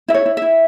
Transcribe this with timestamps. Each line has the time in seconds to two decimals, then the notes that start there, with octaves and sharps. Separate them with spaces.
0.08 E4 E5
0.14 C#5
0.26 E4
0.37 E4 E5